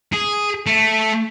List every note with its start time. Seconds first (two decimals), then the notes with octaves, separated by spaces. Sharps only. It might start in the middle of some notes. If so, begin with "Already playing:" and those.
0.13 G#4
0.66 A3